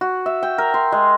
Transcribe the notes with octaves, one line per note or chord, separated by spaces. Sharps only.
F#4
E5
G5
A#4
C6
G#3